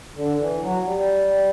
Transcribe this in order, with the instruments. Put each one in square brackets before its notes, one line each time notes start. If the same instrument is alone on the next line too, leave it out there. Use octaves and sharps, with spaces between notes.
[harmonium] D3
E3
F#3
G3